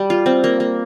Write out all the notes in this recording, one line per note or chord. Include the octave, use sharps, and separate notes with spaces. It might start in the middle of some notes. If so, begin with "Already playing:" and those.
Already playing: G3
F4
C4
A#3
A#3